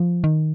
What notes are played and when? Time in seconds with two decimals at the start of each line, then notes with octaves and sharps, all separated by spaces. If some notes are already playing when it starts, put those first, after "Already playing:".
Already playing: F3
0.24 D#3